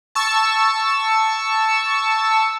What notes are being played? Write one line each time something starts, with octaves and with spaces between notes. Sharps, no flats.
A5 C#6 E6